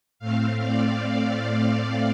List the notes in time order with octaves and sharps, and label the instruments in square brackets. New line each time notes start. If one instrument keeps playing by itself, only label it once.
[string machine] A2 A3 C4 F5
D5
D5